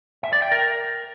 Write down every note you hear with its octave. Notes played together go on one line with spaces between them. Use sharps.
E5
D5
G5
A#4